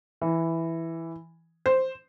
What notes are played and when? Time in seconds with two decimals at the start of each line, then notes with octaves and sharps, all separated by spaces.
0.22 E3
1.66 C5